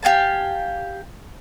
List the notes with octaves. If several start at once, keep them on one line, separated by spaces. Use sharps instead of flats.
G4 F5 G#5 A5